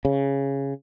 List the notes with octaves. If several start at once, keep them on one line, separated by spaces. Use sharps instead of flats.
C#3